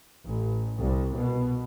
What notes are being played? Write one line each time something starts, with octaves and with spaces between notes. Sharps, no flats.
A1
C2
B2